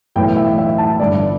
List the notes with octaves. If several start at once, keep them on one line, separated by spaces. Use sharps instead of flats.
B1 A2 E3 G5
E5
E5
A5
G1 G2 D3 D5